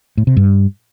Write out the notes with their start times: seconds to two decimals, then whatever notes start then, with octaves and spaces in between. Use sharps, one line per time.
0.17 A2
0.27 C3
0.37 G2